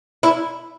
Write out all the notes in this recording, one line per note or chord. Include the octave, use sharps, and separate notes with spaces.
E4